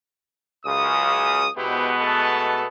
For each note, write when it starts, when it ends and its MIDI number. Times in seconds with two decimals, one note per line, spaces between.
0.65 1.45 37
0.65 1.45 42
0.65 1.45 49
0.65 1.50 87
1.56 2.64 47
1.56 2.64 56
1.56 2.64 59
1.56 1.91 64
1.56 1.91 67
1.56 1.91 72
2.00 2.67 57
2.00 2.67 69
2.00 2.67 81